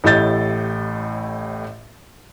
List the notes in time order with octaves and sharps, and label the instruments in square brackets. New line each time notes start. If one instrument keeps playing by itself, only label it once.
[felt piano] A1 A2 G4 D#5 G6 A6